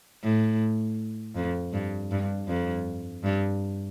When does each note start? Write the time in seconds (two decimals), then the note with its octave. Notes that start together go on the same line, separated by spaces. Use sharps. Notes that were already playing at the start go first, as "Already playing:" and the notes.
0.23 A2
1.36 F2
1.73 G2
2.11 G2
2.48 F2
3.24 G2